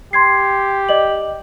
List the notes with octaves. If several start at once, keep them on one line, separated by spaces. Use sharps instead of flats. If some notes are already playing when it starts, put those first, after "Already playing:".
G4 C6 G#6 C7
D5 D#5 F#7